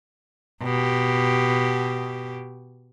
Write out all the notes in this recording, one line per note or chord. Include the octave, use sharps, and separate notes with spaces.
B2 G4